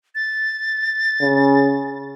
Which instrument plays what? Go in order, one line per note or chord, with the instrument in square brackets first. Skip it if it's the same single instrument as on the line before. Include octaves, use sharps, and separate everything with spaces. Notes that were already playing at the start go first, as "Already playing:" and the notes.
[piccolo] A6
[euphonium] C#3